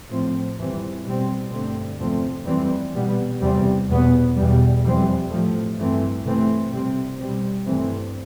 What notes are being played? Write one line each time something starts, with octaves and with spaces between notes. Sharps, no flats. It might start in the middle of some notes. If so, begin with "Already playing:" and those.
A2 F3 C4
F2 E3 G3 C4
B2 G3 C4
G2 D3 A3 C4
E2 C3 F3 A3 C4
F2 E3 G3 C4
B2 G3 B3
E2 C3 G3 C4
E2 B2 B3
E2 B2 G3
F2 E3 G3 C4
A2 F3 A3
G2 E3 A3 C4
C3 E3 A3 C4
C3 G3 C4
B2 G3 C4
G2 E3 A3 C4